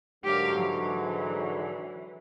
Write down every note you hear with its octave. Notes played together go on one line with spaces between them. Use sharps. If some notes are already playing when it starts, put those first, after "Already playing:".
G#2 D3 F#3 G4 A#4 F5
E3